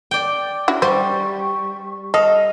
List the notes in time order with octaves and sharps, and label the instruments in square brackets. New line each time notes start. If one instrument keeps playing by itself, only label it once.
[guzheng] D5 G5
[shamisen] C#4 E4 F#4
[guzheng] G3 [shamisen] C5 [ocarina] C#6
[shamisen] A4 [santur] D#5 [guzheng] F5